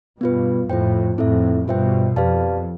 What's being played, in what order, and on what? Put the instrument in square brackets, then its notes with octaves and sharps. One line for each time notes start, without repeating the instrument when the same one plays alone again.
[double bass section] G2 B2 [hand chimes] B3 F4 B4
[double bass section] F2 A2 [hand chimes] F4 C5 G5
[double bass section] F2 A2 [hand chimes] C4 E4 A4 E5
[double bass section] G2 B2 [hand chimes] F4 C5 E5 G5
[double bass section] F2 [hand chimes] G4 B4 D5 F5 A5